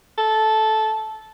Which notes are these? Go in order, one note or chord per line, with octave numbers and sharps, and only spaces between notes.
A4